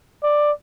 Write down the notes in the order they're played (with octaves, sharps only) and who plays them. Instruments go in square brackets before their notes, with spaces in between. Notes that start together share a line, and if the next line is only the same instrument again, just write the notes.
[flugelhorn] D5